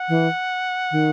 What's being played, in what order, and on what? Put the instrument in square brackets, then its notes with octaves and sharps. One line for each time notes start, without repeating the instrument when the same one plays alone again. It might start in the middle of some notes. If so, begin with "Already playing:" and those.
Already playing: [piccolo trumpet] F#5
[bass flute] E3
D#3